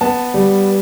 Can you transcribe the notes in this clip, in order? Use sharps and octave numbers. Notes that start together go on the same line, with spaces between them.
B3 A5
G3